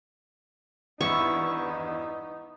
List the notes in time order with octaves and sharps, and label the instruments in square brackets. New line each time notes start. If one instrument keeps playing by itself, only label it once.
[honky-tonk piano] G#1 E2 G2 [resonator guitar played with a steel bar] B3 E4 [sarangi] D#4 [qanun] C#6